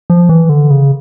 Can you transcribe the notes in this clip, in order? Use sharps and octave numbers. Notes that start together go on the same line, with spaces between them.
F3
E3
D3
C#3